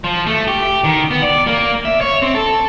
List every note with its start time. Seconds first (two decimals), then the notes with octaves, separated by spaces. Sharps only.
0.04 F3
0.27 A3
0.47 G4
0.84 D#3
1.11 B3
1.22 D5
1.47 A#3
1.85 E5
2.01 C#5
2.22 C4
2.35 A4